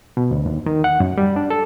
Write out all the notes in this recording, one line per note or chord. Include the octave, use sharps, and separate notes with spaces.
B2
D2
D#2
D#3
F#5
F#2
G3
D4
A4